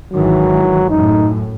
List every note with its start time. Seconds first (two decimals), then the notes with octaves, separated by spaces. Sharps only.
0.13 G#1 D#3 E3 F#3
0.90 F#2 A2 D#4